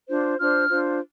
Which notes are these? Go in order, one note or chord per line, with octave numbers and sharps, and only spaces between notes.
D4 F4 C5
D4 F4 C5 F6
D4 F4 C5